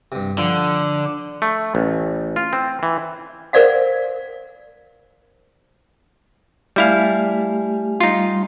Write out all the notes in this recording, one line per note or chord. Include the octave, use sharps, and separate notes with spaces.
G2 C3
D3 F3
A3
A1
F4
C4
E3
A#4 C5 D5 F5 F#5
G3 A3 E4 G4 F5 G#5
G3 D#4 F4